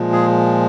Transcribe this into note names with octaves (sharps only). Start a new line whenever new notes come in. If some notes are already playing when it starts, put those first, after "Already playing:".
Already playing: A#2 F3 G#3
G#4